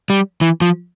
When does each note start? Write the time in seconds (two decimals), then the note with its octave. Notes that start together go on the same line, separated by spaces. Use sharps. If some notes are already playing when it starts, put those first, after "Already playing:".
0.10 G3
0.41 E3
0.61 F3